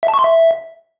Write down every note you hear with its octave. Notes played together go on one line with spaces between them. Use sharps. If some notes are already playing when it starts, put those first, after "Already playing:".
E5
A5
C#6
C6
E5